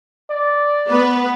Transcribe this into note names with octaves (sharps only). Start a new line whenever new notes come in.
D5
B3 B4